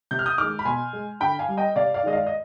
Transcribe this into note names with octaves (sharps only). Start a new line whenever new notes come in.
C3 G6
F6
D#6 G6
D#3 G#3 D6 F6
B5
B2 G#5 C6
G#3
D3 G5 B5
F5 G#5
G3
D#5 G5
C3 D5 F5
D5 F5
D#3 G#3 D#5
D5 F5
D#5